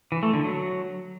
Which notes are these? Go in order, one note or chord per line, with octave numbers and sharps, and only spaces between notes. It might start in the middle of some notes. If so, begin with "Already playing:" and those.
E3
A3
D3
F#3